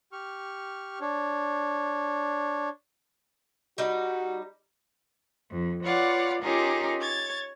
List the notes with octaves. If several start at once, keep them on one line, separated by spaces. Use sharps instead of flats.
G4 C#6 F6
D4 C#5
G3 D#4 F#4
F2
F4 B4 C#5 D5 F5 F#5
C#4 D#4 F4 G4 G#4 A#4
C#5 G#6 A6